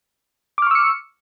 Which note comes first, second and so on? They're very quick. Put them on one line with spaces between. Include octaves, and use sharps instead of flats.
D6 F6 C#6 E6 C#7